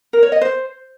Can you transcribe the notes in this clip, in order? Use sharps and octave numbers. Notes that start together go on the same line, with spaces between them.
A#4
C#5
D#5
C5